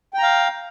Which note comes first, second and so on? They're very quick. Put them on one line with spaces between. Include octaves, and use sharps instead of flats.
G5 A#5 F5